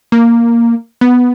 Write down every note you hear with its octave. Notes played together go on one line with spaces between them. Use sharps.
A#3
B3